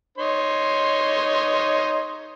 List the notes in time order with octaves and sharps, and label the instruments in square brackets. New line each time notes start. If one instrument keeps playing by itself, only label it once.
[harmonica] D#4 C#5 C6